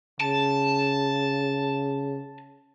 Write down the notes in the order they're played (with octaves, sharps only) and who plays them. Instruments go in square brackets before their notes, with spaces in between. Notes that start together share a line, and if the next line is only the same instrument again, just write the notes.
[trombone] C#3 [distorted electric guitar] A5